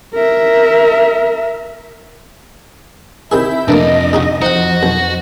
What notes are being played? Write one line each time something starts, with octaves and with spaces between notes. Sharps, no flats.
A#4 E5
C3 D#3 E4 G#4 E6 G6
F2 C3 E3 A3 A#3 D4 D#5
C#3 D#4 F#4
F2 D#4 F#4 C5 D#5 F#5
B1